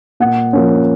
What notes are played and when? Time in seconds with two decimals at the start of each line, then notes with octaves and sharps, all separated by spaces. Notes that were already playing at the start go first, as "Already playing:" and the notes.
0.20 A#2 F#5
0.53 F3 A#3 C#4